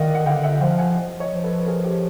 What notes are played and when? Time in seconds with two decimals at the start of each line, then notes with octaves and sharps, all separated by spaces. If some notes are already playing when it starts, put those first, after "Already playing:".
Already playing: D#3 D5 D#5 F5 F#5
0.15 F#5
0.26 D3 F5 G5
0.43 E5 F#5
0.61 F3 F5 G5
0.78 F#5 G#5
1.20 C#5 D#5
1.32 F3
1.40 C5
1.44 A4 B4
1.59 B4
1.67 G#4 A#4
1.84 G4 A4